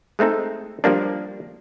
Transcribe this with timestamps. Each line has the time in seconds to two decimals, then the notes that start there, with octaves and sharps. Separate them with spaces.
0.19 G#3 A3 C4 D#4 A4
0.84 F3 G3 A#3 D4